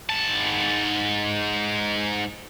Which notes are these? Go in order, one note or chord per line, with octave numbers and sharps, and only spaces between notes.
G#2 A5